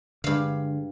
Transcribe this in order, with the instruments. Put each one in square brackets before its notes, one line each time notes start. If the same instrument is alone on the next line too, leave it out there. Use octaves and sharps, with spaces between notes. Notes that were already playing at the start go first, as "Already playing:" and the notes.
[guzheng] G2 F5 [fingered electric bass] D3 G#3